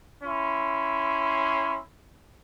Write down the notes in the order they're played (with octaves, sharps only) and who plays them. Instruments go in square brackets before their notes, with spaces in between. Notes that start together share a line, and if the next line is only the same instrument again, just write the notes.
[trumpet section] C#4 E4 C6